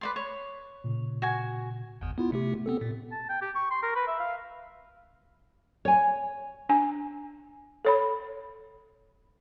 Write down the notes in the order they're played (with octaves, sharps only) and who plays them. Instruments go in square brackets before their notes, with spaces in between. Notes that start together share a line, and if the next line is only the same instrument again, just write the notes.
[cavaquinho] B4 D5 C6
C#5
[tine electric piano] A#2 C#3
[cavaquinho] F#4 G#5
[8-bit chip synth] G1 E2
B3 E4 F4
C3 A3 G4
B3 C4 A4
A#2
[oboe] A5
G5
G4
C#6
C6
A#4
B4
E5
F5
[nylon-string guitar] C#5 G#5
[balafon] D4 G#5
A4 C#5 B5